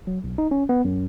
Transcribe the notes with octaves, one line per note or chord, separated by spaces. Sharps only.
F#3
B1
D#4
C#4
B3
F#2